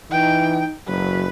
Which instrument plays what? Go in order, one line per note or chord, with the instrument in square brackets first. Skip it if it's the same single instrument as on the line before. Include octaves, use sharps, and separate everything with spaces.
[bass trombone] E3 [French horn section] D#4 [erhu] G5
[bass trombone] F#1 [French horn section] F#3 [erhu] B4